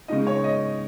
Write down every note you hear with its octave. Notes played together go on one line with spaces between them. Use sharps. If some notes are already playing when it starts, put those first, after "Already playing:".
C#3 G#3 D#4 D#5
C#5
D#5